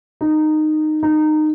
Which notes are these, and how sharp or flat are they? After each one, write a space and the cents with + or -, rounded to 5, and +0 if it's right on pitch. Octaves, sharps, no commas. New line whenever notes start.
D#4 -15
D#4 -20